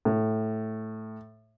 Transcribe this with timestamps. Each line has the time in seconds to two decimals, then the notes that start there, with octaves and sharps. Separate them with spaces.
0.05 A2